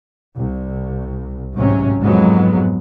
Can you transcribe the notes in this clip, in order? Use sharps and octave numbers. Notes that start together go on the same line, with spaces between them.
C2
A1 G#2 C3 F#3 C#4
F2 G#2 F#3 G#3 B3